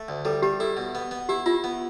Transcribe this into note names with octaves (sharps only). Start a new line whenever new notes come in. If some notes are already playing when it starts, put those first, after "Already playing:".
Already playing: A3
D2
G3 A4
G3 G4
E4 A4
B2
B3
B3
E4 G4
E4 F4
B3